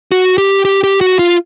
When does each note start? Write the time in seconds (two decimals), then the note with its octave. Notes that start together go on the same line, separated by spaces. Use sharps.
0.12 F#4
0.38 G4
0.65 G4
0.84 G4
1.01 F#4
1.19 F4